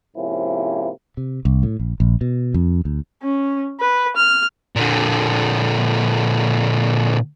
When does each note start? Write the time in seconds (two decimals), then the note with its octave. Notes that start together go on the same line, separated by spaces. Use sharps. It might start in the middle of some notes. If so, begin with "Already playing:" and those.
0.15 G#2 C3 F3 A#3 C#4 E4
1.17 C3
1.45 C2
1.63 A2
1.80 A#1
2.00 A#1
2.21 B2
2.54 F2
2.85 D2
3.22 C#4
3.80 B4
4.17 F6
4.76 A#2 D3